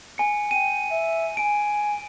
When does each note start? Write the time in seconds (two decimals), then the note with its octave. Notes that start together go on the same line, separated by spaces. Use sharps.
0.18 G#5 C#7
0.51 G5 D#7
0.91 E5
1.37 G#5 D7